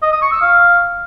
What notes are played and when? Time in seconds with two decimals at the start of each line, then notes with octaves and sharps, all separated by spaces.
0.02 D#5
0.12 D#6
0.22 C#6
0.31 E6
0.41 F5